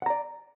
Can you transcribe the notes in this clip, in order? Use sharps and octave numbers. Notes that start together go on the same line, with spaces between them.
D5 F#5 A#5